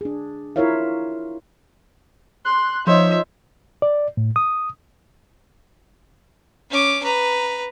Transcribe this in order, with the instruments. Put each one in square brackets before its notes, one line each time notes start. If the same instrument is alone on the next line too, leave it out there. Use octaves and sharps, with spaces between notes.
[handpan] D4 G#4
E4 F4 A#4 C#5 E5 F5
[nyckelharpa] C6 [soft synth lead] F#6
[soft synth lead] F3 [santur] D#4 C5 [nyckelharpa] C#5 E5
[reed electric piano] D5
A2
D#6
[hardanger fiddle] C#4 D6
B4 A#5